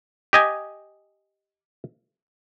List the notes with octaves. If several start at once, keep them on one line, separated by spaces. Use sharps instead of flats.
G4 D#5 G#5